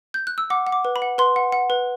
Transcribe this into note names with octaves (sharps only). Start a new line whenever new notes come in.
G6
F#6
E6
F#5 D6
F#5
D6
B4
B5
F#5
B4 C6
F#5
F#5
B4